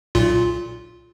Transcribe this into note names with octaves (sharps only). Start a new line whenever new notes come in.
B1 A#2 F4